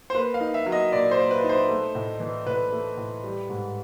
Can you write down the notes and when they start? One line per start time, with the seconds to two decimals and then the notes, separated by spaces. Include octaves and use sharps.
0.10 C5
0.15 A#3 B4
0.34 F5
0.40 D#4
0.54 E5
0.66 F#3
0.72 D#5
0.92 A#2 D5
1.11 C5
1.18 A#3
1.31 B4
1.44 D#4
1.49 C5
1.69 A3
1.95 A2
2.20 E3
2.46 A2 B4
2.72 A3
2.97 A2
3.24 G3
3.49 G#2